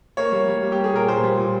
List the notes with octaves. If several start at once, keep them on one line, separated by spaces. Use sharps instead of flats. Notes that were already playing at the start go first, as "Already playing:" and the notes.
A#3 C#5
G3
G3
G3
G4
A#3
G#4
A#2 A#4
A#2 C5
G3
A#2